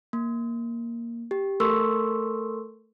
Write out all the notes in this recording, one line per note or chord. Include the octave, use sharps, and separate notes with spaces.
A#3
G4
A3 A4 A#4 C6 C#6 E6